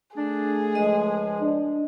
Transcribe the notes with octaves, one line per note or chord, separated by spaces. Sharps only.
A3 D4 G#4
C#2 F3 G#3 D#5
D4